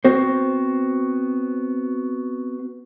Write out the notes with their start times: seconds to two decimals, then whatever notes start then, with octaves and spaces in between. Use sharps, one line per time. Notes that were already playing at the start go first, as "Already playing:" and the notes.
0.05 B3 C4 F#4 C5